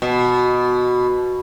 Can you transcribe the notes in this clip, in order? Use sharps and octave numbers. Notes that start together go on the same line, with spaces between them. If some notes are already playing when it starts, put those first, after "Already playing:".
B2